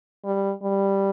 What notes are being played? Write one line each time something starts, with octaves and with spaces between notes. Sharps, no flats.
G3
G3